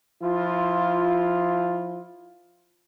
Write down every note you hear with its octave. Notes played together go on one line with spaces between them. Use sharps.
F3 E4 F4